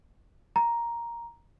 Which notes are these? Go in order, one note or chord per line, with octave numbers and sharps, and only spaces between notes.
A#5